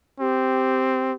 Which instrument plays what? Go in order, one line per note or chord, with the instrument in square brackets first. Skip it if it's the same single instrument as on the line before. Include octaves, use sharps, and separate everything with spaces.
[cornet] C4 [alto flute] G4